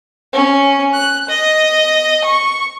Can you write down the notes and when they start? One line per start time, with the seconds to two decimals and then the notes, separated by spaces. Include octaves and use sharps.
0.33 C#4
0.94 F#6
1.29 D#5
2.24 C#6